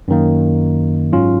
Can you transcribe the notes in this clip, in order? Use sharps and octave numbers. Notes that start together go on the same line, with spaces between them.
F#2 D#3 A#3
G#2 F#3 C#4 F4